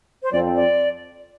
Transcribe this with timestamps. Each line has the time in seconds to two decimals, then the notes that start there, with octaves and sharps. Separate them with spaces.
0.22 C5
0.32 F2 F3 C4 D5
0.55 D5